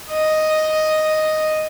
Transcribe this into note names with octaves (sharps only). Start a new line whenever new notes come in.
D#5